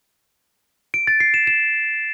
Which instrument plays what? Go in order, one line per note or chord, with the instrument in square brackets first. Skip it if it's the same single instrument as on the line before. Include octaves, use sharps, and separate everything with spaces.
[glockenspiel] D7
A6
C7
E7
E7